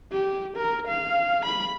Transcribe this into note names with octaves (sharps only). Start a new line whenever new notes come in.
G4
A#4
F5
B5